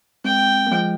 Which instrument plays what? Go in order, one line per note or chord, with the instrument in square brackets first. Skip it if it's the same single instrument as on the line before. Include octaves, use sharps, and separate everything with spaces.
[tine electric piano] G#3 C4 [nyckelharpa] G5
[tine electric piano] A#3
F3 G#3